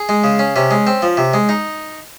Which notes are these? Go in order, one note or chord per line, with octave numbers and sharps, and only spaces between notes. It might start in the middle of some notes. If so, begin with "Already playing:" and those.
Already playing: G#4
G#3
C#3
C#4
C3 C#4
G#3
C4
F3
C3
G#3
D#4